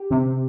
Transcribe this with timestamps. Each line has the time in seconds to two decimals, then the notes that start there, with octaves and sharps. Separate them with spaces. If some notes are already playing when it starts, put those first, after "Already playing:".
Already playing: G4
0.11 C3